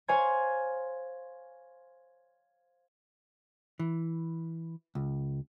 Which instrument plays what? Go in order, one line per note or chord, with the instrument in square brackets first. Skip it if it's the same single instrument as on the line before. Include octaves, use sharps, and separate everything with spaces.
[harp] C5 C#5 F5 G#5 C6 G#6
[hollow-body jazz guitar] E3
C#2